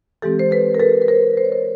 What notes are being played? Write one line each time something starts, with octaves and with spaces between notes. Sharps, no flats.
E3 G#3 C4 G4 A4
C5
A4 B4
A#4
A4 B4
B4
A#4 C5
C5
C#5
A#4 C5